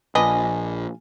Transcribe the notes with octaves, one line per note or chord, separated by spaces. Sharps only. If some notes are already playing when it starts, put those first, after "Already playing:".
A#1 D4 F4 B4 D#5 G#5